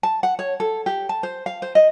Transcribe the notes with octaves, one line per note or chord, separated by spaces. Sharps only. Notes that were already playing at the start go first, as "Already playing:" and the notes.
A5
F#5
C#5
A4
G4
A5
C5
F5
C5
D#5